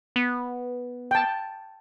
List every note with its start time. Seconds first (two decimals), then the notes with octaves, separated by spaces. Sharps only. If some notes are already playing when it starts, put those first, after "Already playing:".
0.16 B3
1.11 G5 A5